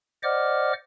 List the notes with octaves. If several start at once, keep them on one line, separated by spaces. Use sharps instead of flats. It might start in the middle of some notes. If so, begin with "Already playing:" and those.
C5 D5 D#5 F#5 D6 F6